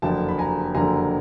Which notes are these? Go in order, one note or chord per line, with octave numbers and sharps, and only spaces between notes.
F#1 F2 D3 G5 A5
B5
G#5 A#5
F#1 F2 D3 G#5 A#5